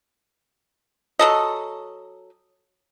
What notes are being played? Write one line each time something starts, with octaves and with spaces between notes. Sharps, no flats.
F#3 A4 D#5